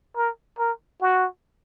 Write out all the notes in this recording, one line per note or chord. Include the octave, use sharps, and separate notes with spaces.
A#4
A#4
F#4